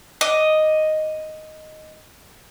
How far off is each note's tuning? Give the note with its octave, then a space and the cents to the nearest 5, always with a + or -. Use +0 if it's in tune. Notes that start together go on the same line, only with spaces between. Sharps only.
D#5 +0 D6 +0